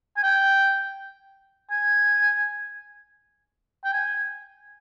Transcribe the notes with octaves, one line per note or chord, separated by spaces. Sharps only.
G#5
G5
G#5
G5
G#5